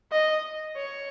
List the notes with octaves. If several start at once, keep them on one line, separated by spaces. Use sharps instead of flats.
D#5
C#5